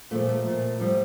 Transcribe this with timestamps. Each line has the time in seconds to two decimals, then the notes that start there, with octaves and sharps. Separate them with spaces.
0.11 A#2 F3 A3
0.29 A3
0.46 A#2 F3
0.80 A2 F3 G3